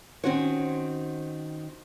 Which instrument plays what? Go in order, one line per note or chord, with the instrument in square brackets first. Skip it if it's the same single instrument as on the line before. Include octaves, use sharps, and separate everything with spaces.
[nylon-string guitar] D#3 C4 C#4 F#4 C5 C#5